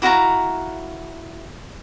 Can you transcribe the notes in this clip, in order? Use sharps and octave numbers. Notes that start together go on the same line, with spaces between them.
E4 F#4 F5 A#5